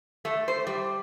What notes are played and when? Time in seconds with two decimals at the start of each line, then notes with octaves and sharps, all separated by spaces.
0.25 A3
0.48 C5
0.67 G3